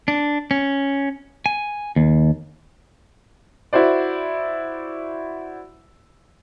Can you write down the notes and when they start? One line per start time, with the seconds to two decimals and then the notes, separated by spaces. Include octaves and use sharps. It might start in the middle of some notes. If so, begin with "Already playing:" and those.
0.08 D4
0.51 C#4
1.46 G#5
1.96 D#2
3.73 E4 F#4 C5 D5